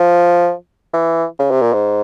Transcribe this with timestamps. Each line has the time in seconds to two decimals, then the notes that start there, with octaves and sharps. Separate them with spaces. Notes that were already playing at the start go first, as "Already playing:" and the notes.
Already playing: F3
0.93 E3
1.39 C#3
1.51 C3
1.62 A#2
1.73 G#2